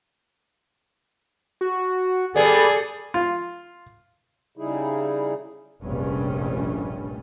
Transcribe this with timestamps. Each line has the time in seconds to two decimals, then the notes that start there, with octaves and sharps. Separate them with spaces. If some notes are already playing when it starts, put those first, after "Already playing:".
1.61 F#4
2.36 G3 B3 G#4 A4 D5
3.14 F4
4.57 C#3 G3 D#4 E4 G#4
5.82 F1 A#1 G2 G3 C#4